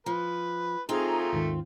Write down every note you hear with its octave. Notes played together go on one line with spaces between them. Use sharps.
F3 B4
F3 A3 C4 D#4 F4 G#4 A#5
D#2 G#2 D#3